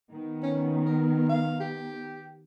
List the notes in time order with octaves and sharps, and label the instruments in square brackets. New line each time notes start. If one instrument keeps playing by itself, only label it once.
[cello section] D#3 B3
[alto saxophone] C#4
A#4
F5
G4